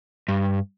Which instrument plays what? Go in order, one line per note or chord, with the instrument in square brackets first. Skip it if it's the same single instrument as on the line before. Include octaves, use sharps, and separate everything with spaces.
[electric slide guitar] G2